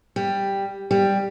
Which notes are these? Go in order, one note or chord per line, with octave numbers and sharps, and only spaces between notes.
G3
G3